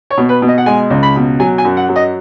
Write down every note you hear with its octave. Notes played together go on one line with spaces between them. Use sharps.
C#5
B2
B4
B2
D#5
F#5
G#3 G#5
C#2
B5
B2
F#3 G#5
G#5
F#2
F#5
F#3
D#5